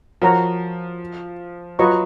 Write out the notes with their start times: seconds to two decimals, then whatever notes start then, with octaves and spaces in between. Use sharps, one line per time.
0.22 F3 F#4 A#4 C#5 F#5 A#5
1.79 F#3 F4 B4 D#5 A#5 C#6